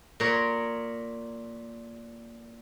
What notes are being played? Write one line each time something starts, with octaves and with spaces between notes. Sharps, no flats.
A#2 A#4 C#5